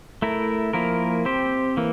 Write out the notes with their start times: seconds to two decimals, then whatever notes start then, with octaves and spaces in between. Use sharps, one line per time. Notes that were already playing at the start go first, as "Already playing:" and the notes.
0.22 A3 E4 A#4
0.73 F3 A#3 E4 A#4
1.25 C4 G4 C5
1.77 E3 A#3